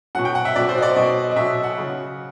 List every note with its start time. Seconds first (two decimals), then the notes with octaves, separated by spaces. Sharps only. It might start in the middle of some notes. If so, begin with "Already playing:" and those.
0.15 B2 F#3 F#5
0.25 G5
0.35 F#5
0.45 E5
0.56 B2 F#3 D5
0.69 C5
0.78 D#5
0.82 D5
0.96 B2 F#3 D#5
1.31 D#5
1.36 B2 F#3 E5
1.63 F#5
1.77 C#3 F#3